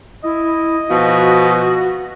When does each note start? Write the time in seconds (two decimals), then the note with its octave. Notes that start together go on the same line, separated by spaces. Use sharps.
0.24 E4 D#5
0.89 B2 F3 F#4